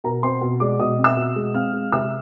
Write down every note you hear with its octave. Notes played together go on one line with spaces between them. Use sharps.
B2 A#4 A#5
C4 C5 C6
B2
G#3 D5 D6
B2 D#5 D#6
C4
E5 E6
B2
G#3
C4 F5 F6
G#3
C3 E5 E6